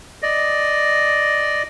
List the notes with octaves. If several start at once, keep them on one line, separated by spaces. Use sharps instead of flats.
D5 D#5